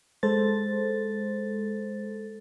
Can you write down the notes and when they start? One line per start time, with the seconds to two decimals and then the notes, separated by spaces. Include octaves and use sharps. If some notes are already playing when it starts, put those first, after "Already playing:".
0.23 G#3 A4 C5 A6